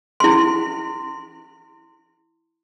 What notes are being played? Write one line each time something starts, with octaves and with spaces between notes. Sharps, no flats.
E4 C6